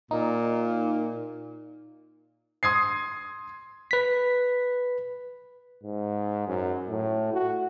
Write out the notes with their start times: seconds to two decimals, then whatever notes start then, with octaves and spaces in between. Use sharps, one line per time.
0.11 A#2 D#4
2.63 C6 D#6 G#6 C7
3.91 B4 B6
5.83 G#2
6.47 F#2
6.89 A2
7.33 F#4